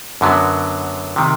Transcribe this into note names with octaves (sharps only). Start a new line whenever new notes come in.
F#2 D3 F#3 B3
C3 D#3